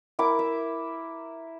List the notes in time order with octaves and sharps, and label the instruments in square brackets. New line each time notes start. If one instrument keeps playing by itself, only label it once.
[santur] E4 A#4 D6
E5